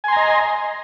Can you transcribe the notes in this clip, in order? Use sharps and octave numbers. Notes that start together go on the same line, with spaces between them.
D#5 G#5 A#5 C6